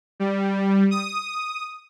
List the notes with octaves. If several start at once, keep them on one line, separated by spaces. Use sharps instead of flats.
G3
D#6